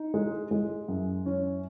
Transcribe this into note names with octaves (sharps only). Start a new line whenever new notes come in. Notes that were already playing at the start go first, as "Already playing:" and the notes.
Already playing: D#4
G#3
G#3
F#2
C#4